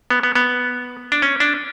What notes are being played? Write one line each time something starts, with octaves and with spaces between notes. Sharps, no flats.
B3
B3
B3
D4
C#4
D4